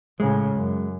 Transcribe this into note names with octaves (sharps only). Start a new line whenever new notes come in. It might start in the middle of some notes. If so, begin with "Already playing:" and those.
A2 C#3 G#3
F#2